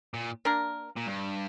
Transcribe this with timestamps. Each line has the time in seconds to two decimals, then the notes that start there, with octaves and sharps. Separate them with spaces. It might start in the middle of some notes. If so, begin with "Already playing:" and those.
0.14 A#2
0.45 A#3 D4 A#4
0.96 A#2
1.07 G2